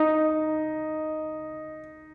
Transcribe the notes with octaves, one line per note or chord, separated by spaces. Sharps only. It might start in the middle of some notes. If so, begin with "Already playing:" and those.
Already playing: D#4